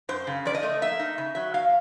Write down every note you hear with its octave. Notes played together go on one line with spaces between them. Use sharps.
F#2 C5
C#3
F3 D5
D#5
A3
A#3 E5
D#4
C#3
F#3 E5
A#3 F5